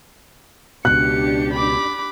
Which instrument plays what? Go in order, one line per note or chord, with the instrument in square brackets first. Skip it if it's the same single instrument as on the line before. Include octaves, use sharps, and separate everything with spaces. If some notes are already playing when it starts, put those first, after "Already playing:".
[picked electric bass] C#2 B2 [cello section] D4 G4 [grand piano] F#6 [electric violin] C#7
[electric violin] B5 D6